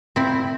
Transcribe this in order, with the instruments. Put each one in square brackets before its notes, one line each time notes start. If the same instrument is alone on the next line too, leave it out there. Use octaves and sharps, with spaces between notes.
[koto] C4 E4